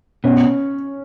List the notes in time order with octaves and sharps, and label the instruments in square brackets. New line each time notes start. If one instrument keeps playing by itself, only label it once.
[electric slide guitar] B2 [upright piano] C#4